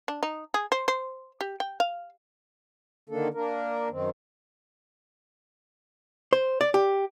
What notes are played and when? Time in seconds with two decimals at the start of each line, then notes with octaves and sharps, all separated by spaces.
0.08 D4
0.23 D#4
0.54 G#4
0.72 C5
0.88 C5
1.41 G4
1.60 G5
1.80 F5
3.09 D3 D#3 A#3 D4 A4
3.34 A#3 D4 A#4
3.90 F#2 D#3 C4
6.33 C5
6.61 D5
6.74 G4